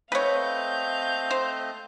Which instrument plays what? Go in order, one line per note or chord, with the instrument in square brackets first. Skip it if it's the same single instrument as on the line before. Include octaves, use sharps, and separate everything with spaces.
[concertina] A3 C4 D#5 [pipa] B4 C#5 [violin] F5 G6
[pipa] C5